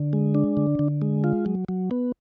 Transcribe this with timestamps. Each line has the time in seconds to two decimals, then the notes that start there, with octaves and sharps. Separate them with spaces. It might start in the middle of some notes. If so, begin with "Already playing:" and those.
Already playing: D3
0.13 G#3
0.35 D4
0.57 D3
0.79 D3
1.02 G#3
1.24 F4
1.46 F#3
1.69 F#3
1.91 B3